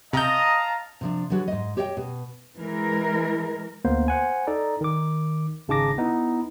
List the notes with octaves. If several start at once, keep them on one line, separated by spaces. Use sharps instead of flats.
C3 D#5 F5 A5 A#5 G6
C3 F3 D4
D3 E3 F#3 F#4 G#4
G#2 D#5
G4 C#5 D#5 F5 G5
B2
E3 G#3 A#4
D2 A#3 B3 C5
C5 F#5 G#5
D#4 A4 D5 A#5
D#3 D6
G#1 C#3 D#4 A5 D6 A#6
B3 D#4 E4